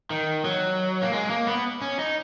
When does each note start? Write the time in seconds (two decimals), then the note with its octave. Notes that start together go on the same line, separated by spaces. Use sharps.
0.10 D#3
0.45 F#3
1.02 A#3
1.13 G#3
1.30 A#3
1.47 B3
1.82 C#4
1.99 D#4